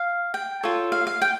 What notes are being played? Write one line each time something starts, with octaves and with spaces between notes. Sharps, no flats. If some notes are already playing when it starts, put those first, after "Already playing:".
Already playing: F5
G5
F4 A4 C#5
F5
F5
G5